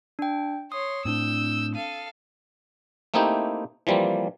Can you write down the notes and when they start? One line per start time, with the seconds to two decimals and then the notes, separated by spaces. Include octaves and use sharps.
0.19 D4 G5
0.72 C#5 C6 D#6
1.05 A2 C4 D4 E6 G6
1.75 A4 F5 D#7
3.14 A3 A#3 C4 D#4 E4 G4
3.87 E3 F3 G3 A#3 C4